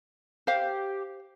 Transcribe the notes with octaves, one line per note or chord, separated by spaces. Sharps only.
G4 C5 F5